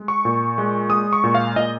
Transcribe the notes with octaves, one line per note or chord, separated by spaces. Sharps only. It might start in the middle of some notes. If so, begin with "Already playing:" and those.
Already playing: G#3
C#6
A#2
G#3
G#3 D#6
C#6
A#2
F5
A#2 D#5